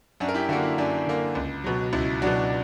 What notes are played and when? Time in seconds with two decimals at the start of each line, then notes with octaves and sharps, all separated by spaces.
0.20 F#2 D4 F#4
0.28 A#4
0.34 E4 G4
0.49 D3 D4 F#4
0.52 A#3
0.63 E4
0.78 F#2 D4
1.06 D3 A#3
1.35 C#2
1.64 B2 F#3
1.93 C#2 E4
2.22 B2 F#3 D4 F#4